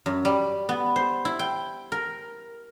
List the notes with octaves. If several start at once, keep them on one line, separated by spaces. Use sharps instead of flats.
F#2
G3
B3
C5
E4
G5
A#4